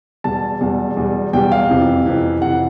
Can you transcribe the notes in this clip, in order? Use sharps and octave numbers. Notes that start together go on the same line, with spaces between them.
E2 B2 G3 A5
E2 B2 G3
E2 B2 G3
E2 B2 G3 G5
F5
F2 C3 E3
F2 C3 E3
F2 C3 E3 F#5